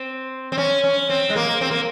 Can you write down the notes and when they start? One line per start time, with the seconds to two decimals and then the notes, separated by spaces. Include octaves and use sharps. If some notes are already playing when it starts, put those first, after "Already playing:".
Already playing: C4
0.52 C4
0.58 C#4
0.84 C#4
1.10 C4
1.30 G#3
1.36 A#3
1.61 C4
1.71 A#3